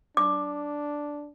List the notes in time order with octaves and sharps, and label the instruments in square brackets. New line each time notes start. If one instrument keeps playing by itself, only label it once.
[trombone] D4 [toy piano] D6